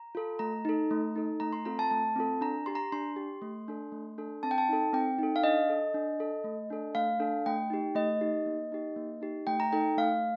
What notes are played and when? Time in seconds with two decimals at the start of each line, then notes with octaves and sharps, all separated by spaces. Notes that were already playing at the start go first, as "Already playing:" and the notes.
Already playing: A#5
0.15 F4 A4
0.39 A3 A#5
0.65 D#4 A4
0.91 A3
1.15 D#4 A4
1.40 A3 A#5
1.53 C6
1.65 C4 F4 A4 A#5
1.79 A5
1.91 A3 A5
2.16 C4 F4 A4
2.41 D4 A#5
2.66 G4 C6
2.75 A#5
2.92 D4 C6
3.16 G4
3.42 A3
3.68 D4 A4
3.92 A3
4.18 D4 A4
4.43 C4 A5
4.51 G5
4.58 A5
4.69 D#4 A4
4.93 C4 G5
5.19 D#4 A4
5.36 F5
5.43 D4 D#5
5.69 A4
5.94 D4
6.20 A4
6.44 A3
6.70 D4 A4
6.95 A3 F5
7.20 D4 A4
7.46 A3 G5
7.70 D#4 G4
7.95 A3 D#5
8.21 D#4 G4
8.46 A#3
8.72 D#4 G4
8.96 A#3
9.21 D#4 G4
9.47 A3 G5
9.60 A#5
9.73 D#4 A4 G5
9.98 A3 F5